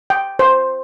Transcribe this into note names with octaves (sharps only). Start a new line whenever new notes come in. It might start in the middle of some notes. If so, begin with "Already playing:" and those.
G5
C5